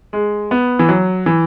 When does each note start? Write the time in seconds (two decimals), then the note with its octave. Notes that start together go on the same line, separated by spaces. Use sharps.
0.13 G#3
0.51 B3
0.79 E3
0.89 F#3
1.26 E3